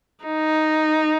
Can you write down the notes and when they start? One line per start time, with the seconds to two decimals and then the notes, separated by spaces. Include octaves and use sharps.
0.25 D#4